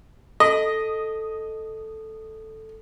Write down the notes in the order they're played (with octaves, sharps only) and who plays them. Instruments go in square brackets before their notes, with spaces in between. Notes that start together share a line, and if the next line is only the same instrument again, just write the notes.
[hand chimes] A4 [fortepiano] D#5